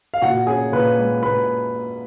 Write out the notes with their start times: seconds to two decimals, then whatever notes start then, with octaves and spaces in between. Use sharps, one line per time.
0.14 F5
0.22 A#2 F#4 F#5
0.47 C#4 G#4 G#5
0.72 A#2 B4 B5
0.98 G#3
1.22 A#2 B4 B5